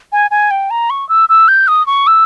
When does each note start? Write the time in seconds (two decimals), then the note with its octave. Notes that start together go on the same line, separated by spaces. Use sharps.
0.12 G#5
0.31 G#5
0.51 G5
0.70 A#5
0.90 C#6
1.09 E6
1.29 E6
1.48 G6
1.68 D#6
1.86 C#6
2.07 E6